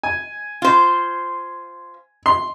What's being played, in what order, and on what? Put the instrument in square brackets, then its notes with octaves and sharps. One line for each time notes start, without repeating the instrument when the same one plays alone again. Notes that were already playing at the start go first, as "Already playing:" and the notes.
[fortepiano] G#5
[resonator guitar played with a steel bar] F4 C5
[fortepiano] C6